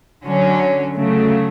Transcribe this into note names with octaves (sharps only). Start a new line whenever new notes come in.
D3 F#3 C#4
C#3 F#3 A3